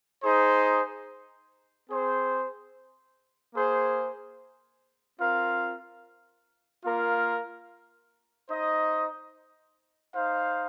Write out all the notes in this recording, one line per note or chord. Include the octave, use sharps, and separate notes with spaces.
D#4 G#4 C5
C4 G#4 C5
A#3 G#4 C5
C4 F4 A#4 F5
A#3 F4 A#4 F5
D#4 C5 D#5
D#4 C5 F5